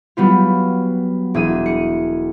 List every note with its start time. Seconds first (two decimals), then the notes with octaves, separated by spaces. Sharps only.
0.17 F#3 G3 B3 F4
1.34 E1 D4 G#4 G#5 E6 D#7
1.66 G#4 C#7